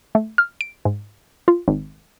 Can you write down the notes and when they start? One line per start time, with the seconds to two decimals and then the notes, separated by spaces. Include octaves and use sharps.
0.15 A3
0.38 F6
0.61 D7
0.85 G#2
1.48 F4
1.68 G#1